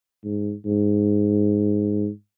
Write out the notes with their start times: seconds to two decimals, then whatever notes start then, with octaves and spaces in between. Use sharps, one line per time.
0.24 G#2
0.65 G#2